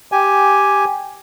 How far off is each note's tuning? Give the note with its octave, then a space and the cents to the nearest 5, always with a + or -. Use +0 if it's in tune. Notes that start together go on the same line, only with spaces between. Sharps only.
G4 +0 G#5 +0